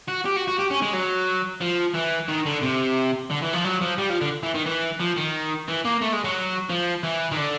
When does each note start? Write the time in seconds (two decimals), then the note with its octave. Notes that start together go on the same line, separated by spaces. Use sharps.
0.09 F#4
0.26 G4
0.37 F#4
0.48 F#4
0.59 G4
0.71 C#4
0.82 G#3
0.93 F#3
1.61 F3
1.94 E3
2.28 D#3
2.46 D3
2.63 C3
3.30 D3
3.42 E3
3.53 F3
3.64 F#3
3.81 F3
3.98 G3
4.10 F3
4.21 D3
4.43 E3
4.54 D#3
4.66 E3
5.00 F3
5.16 D#3
5.68 E3
5.85 A#3
6.01 A3
6.13 G#3
6.24 F#3
6.70 F3
7.04 E3
7.32 D#3
7.37 D3